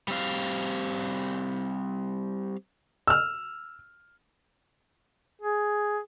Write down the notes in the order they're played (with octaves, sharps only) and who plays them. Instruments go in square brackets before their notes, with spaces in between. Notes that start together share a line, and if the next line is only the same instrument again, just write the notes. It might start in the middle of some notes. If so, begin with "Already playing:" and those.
[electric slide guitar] G3 C4 F5
[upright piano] E6 F6
[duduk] G#4